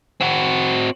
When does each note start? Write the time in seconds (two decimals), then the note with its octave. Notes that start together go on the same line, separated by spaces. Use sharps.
0.21 C4 F#4